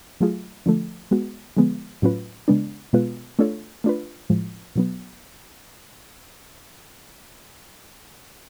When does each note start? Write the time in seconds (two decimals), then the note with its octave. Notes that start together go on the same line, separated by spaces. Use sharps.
0.20 F#3 A3 F4 G#4
0.66 D3 F3 A3
1.11 G#3 B3 F#4
1.57 D3 F3 G#3 B3
2.02 A2 F#3 C#4 F4 B4
2.48 C#3 G#3 B3 D4
2.93 B2 G#3 B3 F4 B4
3.39 A3 D4 F4 A4 C#5
3.84 A3 D4 F4 B4
4.30 A2 F3 G#3
4.75 B2 F#3 B3